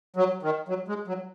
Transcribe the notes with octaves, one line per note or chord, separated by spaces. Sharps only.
F#3
D#3
F#3
G#3
F#3